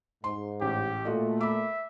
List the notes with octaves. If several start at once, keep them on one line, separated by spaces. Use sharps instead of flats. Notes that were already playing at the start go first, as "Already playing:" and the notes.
G#2 C6
A1 G4
A#2 A3 F4 F#4 D#5
E5 B5 D6